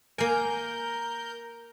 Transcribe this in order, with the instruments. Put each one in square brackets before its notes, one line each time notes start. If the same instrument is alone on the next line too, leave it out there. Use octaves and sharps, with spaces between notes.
[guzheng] A#3 G#5 [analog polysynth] A#4 G6